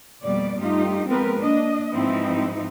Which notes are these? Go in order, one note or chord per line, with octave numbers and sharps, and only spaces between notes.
F2 B2 G3 A#3 D5
G2 A3 D#4 F4 G4
F3 G#3 B3 C4 A#4 B4
A#3 D4 D#5
G#2 E3 F3 C4 D#4 E4